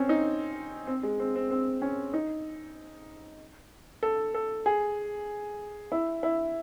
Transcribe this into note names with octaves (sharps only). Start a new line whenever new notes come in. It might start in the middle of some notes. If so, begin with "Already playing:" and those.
Already playing: C4 C#4
D#4
C4
G#3
C4
C4
C4
C#4
D#4
A4
A4
G#4
E4
E4